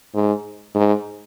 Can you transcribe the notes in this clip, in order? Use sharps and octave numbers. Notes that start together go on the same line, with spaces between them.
G#2
G#2